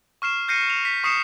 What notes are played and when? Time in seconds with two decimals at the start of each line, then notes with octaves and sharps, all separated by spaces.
0.22 C#6 F6 C7 E7
0.48 F6 G6 A#6 C7 C#7 D#7
0.70 F7
0.85 B6
1.04 C#6 D#6 C7 C#7 E7